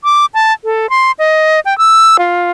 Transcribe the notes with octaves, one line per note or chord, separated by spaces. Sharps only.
D6
A5
A4
C6
D#5
G5
E6
F4